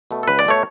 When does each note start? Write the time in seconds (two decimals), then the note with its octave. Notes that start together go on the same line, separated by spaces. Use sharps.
0.11 B2 A3
0.23 A4
0.28 C#2 B4
0.39 D5
0.45 B2 A3 C#5